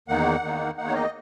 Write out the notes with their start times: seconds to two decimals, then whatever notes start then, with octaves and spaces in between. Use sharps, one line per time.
0.08 E2 D#3 A#3 D#4 F#5
0.43 E2 D#3 A#3 D#4
0.77 E2 D#3 A#3 D#4 F#5
0.87 C#5
0.95 D#5